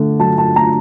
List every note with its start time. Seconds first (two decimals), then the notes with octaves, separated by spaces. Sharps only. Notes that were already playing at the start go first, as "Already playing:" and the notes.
Already playing: D3 A3
0.20 F#3 A5
0.38 A5
0.56 A3 A#5